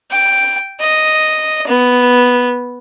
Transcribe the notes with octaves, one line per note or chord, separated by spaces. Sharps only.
G5
D#5
B3